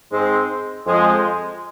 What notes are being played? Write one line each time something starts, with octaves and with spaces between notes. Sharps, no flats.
G#2 G#3 C4
F2 F3 G#3